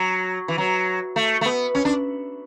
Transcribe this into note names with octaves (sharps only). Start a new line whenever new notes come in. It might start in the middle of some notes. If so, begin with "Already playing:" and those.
Already playing: F#3
E3
F#3
A3
A3
B3
C#4
D4